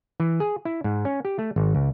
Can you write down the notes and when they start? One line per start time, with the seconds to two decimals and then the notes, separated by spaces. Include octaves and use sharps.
0.20 E3
0.40 G#4
0.65 E4
0.84 G#2
1.05 C#4
1.25 G4
1.39 A3
1.56 G#1
1.75 C#2